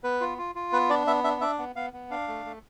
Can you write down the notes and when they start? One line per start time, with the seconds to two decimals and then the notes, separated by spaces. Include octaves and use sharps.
0.04 B3 B4
0.21 F4
0.38 F4
0.55 F4
0.72 B3 B4
0.89 D4 D5
1.07 B3 E5
1.24 D4 E5
1.41 D4 E5
1.59 B3
1.76 B3 F5
1.93 B3
2.10 D4 F5
2.28 A3
2.46 A3